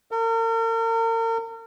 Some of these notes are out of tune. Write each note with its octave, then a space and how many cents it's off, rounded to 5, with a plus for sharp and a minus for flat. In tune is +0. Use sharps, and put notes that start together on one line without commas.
A#4 -40